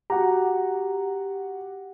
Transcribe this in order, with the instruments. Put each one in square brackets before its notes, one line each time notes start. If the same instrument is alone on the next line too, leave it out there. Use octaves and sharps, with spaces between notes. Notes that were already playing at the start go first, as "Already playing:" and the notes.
[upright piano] F#4 A#5 [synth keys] G4 F#5